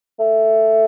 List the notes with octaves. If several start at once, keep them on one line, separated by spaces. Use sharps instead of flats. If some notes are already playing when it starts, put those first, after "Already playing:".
A3